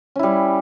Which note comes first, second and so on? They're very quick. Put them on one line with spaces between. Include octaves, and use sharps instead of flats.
C#4 E4 G3